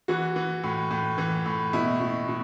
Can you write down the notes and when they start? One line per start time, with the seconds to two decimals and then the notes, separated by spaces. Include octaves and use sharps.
0.08 E3 F#4
0.36 E3
0.63 A2
0.91 A2
1.18 E3
1.46 A2
1.73 B2 E4
2.00 B2
2.28 B2